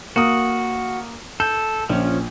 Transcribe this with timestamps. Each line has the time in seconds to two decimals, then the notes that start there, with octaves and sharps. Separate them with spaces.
0.16 A#3 F#4 D#6
1.40 A4 G6
1.89 A#1 F3 C#4